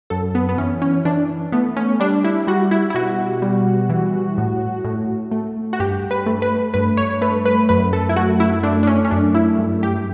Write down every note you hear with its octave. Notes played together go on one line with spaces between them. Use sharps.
F#2 A4
B3
B3
E3 C#4
C#4
E3 D4
A3 B3
C#4
G3 D4
E4
G3 F#4
E4
E4
B2 F#4
G3
E3
A2
A2
A3
F#4
G2 G4
B4
A3
B4
G2 B4
C#5
A3 B4
B4
F#2 B4
A4
E4
A3 F#4
E4
A3 D4
D4
C#4
C#4
F#2 D4
E4
G2
G4